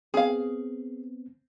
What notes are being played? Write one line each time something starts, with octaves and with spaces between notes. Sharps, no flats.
B3 C4 G#4 F5